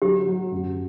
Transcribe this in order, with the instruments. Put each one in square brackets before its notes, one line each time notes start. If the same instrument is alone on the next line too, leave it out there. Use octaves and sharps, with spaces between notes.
[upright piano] F#3 [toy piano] G4
[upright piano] F#3
F#2